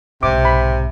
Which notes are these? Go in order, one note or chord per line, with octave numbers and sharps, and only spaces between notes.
B1 G#2 C3 D6
B5